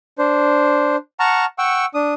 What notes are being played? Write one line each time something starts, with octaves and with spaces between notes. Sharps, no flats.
D4 C5
F#5 A5 A#5 C#6 F6
F#5 G5 C#6 E6
D4 D#6